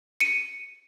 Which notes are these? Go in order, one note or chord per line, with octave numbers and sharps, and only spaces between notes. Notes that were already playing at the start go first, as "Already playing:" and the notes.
C#7 D#7